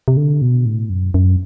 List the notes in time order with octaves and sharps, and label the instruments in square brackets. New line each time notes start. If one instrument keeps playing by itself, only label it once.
[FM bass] C3
D3
B2
A2
F#2
F#2